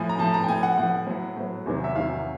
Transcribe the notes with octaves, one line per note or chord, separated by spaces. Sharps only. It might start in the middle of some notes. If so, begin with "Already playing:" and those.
Already playing: A2 F3 G#5
A#5
A2 F3 A5
A#5
G5
A2 F3 G#5
F#5
A2 F3 F#5
A2 F#3
A2 F#3
E2 C3 D#3 F#3
E5
E2 C3 D#3 F#3 F5